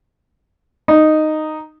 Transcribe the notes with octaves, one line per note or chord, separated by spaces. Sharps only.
D#4